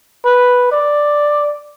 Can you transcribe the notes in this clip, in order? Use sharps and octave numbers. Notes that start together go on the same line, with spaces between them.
B4
D5